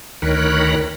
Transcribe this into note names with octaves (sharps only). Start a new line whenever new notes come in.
D2 D#3 A#4 C#5 B5 F#6